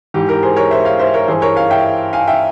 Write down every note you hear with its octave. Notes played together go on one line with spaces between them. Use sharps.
G#2 E3 G4
G4 A#4
G#4 C5
A#4 C#5
C5 E5
C#5 F5
C5 E5
A#4 C#5
G2 E3 G#4 C5
A#4 C#5
C#5 F5
E5 G5
F5 G#5
E5 G5